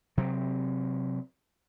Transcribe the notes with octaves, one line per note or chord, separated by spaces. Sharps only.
C3 F#3 C4